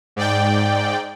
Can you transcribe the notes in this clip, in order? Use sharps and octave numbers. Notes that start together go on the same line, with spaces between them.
G#2 D5 G5